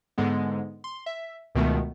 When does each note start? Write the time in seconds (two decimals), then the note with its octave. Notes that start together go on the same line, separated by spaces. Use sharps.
0.18 G#2 D3 G#3 B3
0.84 C6
1.06 E5
1.55 C#2 B2 D#3 A3 B3